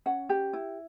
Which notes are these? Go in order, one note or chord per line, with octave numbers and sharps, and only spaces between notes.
C#4 F#5
G4
E4